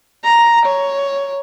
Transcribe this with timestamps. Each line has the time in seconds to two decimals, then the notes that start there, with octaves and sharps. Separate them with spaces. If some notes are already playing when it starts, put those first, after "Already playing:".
0.24 A#5
0.66 C#5